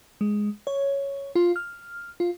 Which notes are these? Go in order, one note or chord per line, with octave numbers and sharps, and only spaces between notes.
G#3
C#5
F4
F6
F4